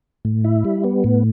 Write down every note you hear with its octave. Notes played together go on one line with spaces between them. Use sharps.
A2
E4
G3
B3
A2